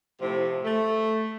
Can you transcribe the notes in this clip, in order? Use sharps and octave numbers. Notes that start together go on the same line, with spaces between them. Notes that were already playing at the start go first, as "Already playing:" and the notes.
A2 C3 F3
A3